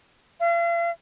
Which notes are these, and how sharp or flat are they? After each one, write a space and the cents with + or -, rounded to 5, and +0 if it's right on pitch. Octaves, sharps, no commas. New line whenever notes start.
F5 -45